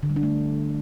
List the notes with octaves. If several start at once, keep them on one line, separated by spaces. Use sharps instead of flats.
D3
G3
D4
A3